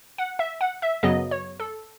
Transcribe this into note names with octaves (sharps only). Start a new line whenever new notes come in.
F#5
E5
F#5
E5
F#2 C#3 F#3 B3 D#5
C#5
A4